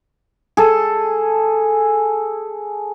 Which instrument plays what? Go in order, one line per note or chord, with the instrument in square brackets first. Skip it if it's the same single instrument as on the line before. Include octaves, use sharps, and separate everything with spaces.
[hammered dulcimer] G#4 A4